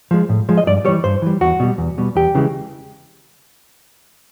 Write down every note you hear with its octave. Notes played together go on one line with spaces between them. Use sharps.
F3 G#3
A2
F3 G#3
D#5
G2 D5
E3 G3 C#5
G2 C5
E3 G3
E2 F#4
B2 G3
E2
B2 G3
E2 G4
C#3 E3 G#3